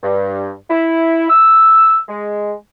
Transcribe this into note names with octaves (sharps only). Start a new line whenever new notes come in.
G2
E4
E6
G#3